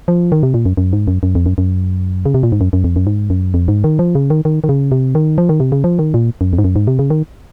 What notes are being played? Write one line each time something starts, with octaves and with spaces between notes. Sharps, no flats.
F3
D#3
C3
A#2
F#2
F#2
G#2
F#2
F#2
F2
F#2
F#2
C#3
C3
A#2
G#2
F#2
F#2
F2
F#2
G#2
F#2
F2
G#2
D#3
F3
C#3
D#3
D#3
D#3
C#3
C3
D#3
F3
D#3
C3
C#3
F3
D#3
A#2
F#2
F2
G#2
F#2
G#2
C3
C#3
D#3